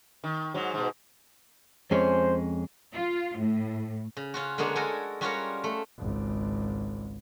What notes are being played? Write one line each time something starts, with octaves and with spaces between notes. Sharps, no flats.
D#3
G#2 F#3
G#2 B2
F2 G#3 C#4 C5
F4
A2
C#3
C#4 F4 F#4
D3 G#3 A#3 B3 G#4 C#5
G#3 F#4 A4 A#4 G#5
G3 C#4 F4 F#4 A#4 C#5
A3
G#1 C#2